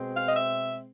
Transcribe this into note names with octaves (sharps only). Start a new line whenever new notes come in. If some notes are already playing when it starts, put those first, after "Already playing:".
Already playing: B2 G#3 C4
F5
D#5
E5